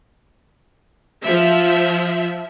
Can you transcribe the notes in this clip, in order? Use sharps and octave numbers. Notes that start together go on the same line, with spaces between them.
F3 E5